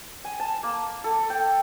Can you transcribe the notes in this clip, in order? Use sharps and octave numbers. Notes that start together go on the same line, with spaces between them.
G#5
A5
A#3
A4
G5